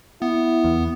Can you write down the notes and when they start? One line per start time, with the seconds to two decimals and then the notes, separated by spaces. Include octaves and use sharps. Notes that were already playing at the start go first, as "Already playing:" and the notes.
0.22 B3 E4
0.64 E2